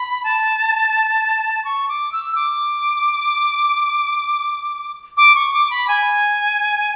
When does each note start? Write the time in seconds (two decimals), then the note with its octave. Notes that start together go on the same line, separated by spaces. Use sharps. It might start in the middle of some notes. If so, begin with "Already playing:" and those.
Already playing: B5
0.24 A5
1.65 C#6
1.89 D6
2.12 E6
2.35 D6
5.17 D6
5.35 C#6
5.54 D6
5.71 B5
5.88 G#5